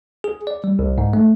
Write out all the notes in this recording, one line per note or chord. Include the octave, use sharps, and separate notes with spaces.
G#4
D5
G3
C2
G#2
A3